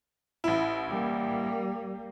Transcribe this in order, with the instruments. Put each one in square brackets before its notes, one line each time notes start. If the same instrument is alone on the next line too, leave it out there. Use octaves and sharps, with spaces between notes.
[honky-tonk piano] A1 E4
[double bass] G3 A#3